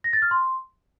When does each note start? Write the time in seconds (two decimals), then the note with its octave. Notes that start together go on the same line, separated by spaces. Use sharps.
0.04 A#6
0.13 A6
0.22 F6
0.31 C6